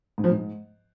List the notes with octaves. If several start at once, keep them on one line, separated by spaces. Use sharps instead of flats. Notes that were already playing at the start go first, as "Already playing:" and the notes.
G#2
F3
G#2